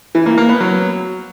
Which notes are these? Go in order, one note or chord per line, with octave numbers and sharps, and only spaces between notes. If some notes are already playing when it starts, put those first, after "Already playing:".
E3
A#3
A#3
B3
F#3